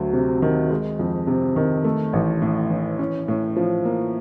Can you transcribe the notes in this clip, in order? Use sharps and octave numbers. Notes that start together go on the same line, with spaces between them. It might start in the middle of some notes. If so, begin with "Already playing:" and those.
Already playing: D2 F#3
C3
D#3
G#3
F2
C3
D#3
A3
A1
A2
E3
C#4
A2
F3
A#3